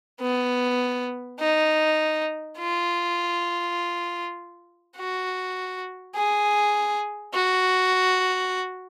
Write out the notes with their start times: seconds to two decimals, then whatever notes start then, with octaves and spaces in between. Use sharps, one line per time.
0.21 B3
1.40 D#4
2.58 F4
4.96 F#4
6.15 G#4
7.34 F#4